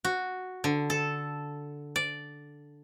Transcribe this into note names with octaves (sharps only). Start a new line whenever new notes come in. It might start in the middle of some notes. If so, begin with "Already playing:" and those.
F#4
D3
A4
D5